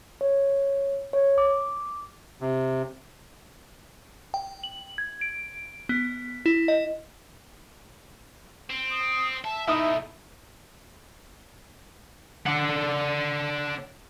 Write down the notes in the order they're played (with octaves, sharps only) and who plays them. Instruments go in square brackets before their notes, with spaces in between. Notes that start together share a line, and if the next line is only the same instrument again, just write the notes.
[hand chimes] C#5
C#5
D6
[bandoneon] C3
[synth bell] G5
F#7
G#6
D7
B3
E4
D#5
[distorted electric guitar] C4
[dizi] D#6
[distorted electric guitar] E5 [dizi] A5
[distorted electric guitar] B2 A3 [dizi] D#4 [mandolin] E4 E5 D#6
[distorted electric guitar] D4 F#5